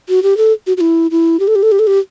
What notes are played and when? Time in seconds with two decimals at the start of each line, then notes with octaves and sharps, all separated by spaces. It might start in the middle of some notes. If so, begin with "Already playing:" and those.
0.09 F#4
0.23 G4
0.37 A4
0.67 F#4
0.77 F#4
0.81 E4
1.11 E4
1.40 G4
1.48 A4
1.55 G4
1.63 A4
1.72 G4
1.79 A4
1.87 G4